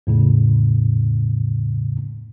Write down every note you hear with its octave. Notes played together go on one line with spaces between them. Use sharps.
E2 A2 C#3